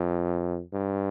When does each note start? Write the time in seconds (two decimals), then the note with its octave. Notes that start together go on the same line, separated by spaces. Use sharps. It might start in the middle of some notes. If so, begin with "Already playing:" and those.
Already playing: F2
0.73 G2